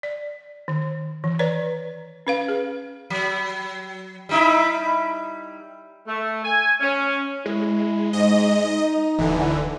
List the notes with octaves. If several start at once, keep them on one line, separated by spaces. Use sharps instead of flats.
D5
D#3
E3
B4 C#5 D5 A#5
C#4 B4 F5
G#4
F#3
G3 D#4 E4
A3
G#5
C#4
G#3 E4
G#2 D#5
D#4
D1 D3 E3